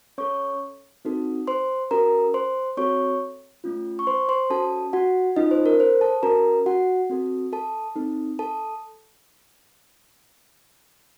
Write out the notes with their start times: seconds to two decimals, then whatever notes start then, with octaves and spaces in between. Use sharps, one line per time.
0.18 C#4 A4 C#5 C#6
1.05 C4 D#4 F#4 A4
1.47 C5 C6
1.91 C#4 F#4 A4 A#4 A#5
2.34 C5 C6
2.77 C4 F#4 A4 C#5 C#6
3.64 A3 C#4 F4
3.99 C#6
4.07 C5 C6
4.29 C5 C6
4.50 C#4 F#4 A4 A5
4.93 F#4 F#5
5.36 C#4 D#4 F4 A4 D#5
5.51 C5
5.66 A#4
5.80 C5
6.01 A4 A5
6.23 C#4 F#4 A4 A#4 A#5
6.66 F#4 F#5
7.10 C4 F#4 A4
7.53 A4 A5
7.96 C4 D#4 A4
8.39 A4 A5